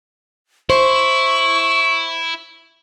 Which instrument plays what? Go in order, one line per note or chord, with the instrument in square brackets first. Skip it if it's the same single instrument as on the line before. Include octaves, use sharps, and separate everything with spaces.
[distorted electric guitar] E4 [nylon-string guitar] C5 [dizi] C#6